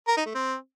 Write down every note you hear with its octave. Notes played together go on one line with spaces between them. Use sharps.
A#4
D#4
A3
C4